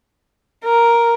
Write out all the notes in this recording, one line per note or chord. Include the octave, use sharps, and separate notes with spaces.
A#4